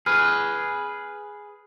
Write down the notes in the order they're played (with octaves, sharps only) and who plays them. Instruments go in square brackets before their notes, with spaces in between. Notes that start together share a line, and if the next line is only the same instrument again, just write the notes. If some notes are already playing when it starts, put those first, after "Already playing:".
[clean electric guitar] G#4 B4 [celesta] F6